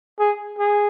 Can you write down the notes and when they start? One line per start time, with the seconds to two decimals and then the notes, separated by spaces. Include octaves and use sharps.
0.19 G#4
0.59 G#4